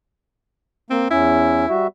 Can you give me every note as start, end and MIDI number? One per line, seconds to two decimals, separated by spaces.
0.90 1.08 58
0.90 1.07 60
1.11 1.66 40
1.11 1.66 61
1.11 1.71 64
1.70 1.87 55
1.70 1.87 66
1.70 1.87 76